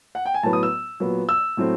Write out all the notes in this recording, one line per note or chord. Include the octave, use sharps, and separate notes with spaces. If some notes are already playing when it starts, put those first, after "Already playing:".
F#5
G5
G#5
A2 F#3 B3 A5
D#6
E6
A#2 F#3 B3
E6
A2 F#3 A3 C4